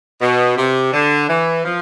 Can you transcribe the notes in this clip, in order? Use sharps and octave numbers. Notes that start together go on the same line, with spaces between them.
B2
C3
D3
E3
F3